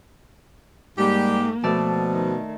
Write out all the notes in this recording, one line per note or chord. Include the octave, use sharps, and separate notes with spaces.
G#2 G3 A#3 G4
B2 F3 A3 D5 A5
D#3